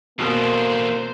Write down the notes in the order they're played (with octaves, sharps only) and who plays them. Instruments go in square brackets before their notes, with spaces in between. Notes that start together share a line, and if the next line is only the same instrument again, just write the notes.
[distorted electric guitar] E2 D3 [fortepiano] B2 [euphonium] A#3 [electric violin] C5